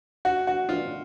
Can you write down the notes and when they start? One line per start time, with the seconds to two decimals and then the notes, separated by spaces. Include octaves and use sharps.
0.25 F#4
0.47 F#4
0.69 F4